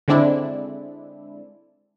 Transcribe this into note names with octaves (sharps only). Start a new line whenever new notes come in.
D3 G#3 C4 D4 E4